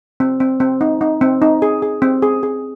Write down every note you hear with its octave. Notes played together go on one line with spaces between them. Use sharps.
C4
C4
C4
D#4
D#4
C4
D#4
G#4
G#4
C4
G#4
G#4